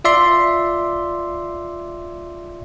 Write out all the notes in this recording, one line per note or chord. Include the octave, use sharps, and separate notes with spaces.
F4 D5 E5 C6